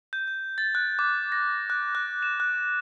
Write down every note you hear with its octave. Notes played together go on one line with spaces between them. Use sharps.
G6
G6
A6
F#6
D6
A#6
F#6
F#6
E7
F#6